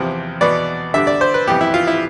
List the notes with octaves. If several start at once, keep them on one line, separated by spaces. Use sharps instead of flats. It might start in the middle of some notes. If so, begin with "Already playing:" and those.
Already playing: E2 C3 F3 C4
E2 B2 B3 D5
D3 G3 D4 E5
D5
C5
B4
F2 C3 E3 G3 B3 G4
E4
F4
E4